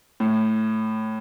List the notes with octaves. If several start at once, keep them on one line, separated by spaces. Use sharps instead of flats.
A2